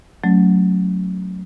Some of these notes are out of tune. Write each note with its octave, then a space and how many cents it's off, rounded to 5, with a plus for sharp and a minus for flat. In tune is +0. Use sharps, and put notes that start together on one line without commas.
F#3 +0 A3 +0 C#4 +0